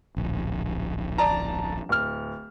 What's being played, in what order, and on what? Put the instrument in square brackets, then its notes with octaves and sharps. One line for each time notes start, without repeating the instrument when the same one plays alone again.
[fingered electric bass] D1 A#1
[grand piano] D5 A5 A#5
D1 F6